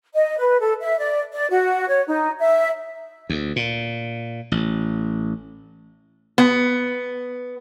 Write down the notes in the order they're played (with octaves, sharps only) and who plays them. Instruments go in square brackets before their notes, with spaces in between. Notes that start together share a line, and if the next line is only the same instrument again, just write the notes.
[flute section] D#5
B4
A4
E5
D5
D5
F#4
C#5
D#4
E5
[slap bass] D2
A#2
A1
[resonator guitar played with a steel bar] B3